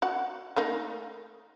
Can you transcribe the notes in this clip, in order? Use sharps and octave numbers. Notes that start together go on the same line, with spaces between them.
F#4 F#5
A3 A#3 D#4